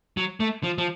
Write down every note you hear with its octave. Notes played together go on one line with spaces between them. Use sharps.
F#3
A3
F3
F3